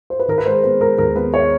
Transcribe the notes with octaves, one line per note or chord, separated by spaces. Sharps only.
C5
B4
D#3 A#4
B4
G#3 C5
B3 B4
G#3 A#4
D#2 A#4
B3 B4
C#5